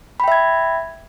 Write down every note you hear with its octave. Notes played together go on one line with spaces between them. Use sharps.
E5 G5 B5 G#6